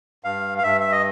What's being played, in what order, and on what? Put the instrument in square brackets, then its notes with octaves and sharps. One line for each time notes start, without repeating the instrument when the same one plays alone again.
[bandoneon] G2 F5
F5
G2 E5
E5
D#5